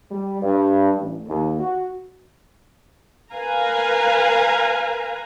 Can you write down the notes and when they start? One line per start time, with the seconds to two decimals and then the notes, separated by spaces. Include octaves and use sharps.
0.11 G3
0.42 G2
0.98 A1
1.28 D#2
1.60 F#4
3.33 A#4 B4 F5 G#5 A#5